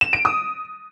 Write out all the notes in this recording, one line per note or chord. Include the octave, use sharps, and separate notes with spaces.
E7
D7
D#6